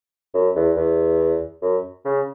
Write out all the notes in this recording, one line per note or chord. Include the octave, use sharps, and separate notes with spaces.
F#2
E2
E2
F#2
C#3